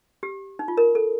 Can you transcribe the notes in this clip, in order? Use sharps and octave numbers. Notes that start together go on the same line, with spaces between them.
G4
D#4
F4
A#4
A4